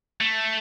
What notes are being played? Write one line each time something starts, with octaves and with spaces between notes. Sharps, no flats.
A3